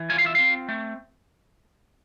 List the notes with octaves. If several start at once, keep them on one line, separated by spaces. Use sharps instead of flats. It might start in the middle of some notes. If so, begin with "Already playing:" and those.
Already playing: E3
F4 G#5
F5
E5
C4 F5
A3